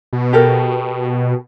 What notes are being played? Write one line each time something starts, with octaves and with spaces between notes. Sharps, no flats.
B2
G4 A4 A#4